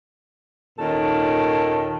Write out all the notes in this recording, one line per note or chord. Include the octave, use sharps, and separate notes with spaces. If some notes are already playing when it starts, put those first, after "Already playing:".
D#2 A#2 D#3 C#4 A4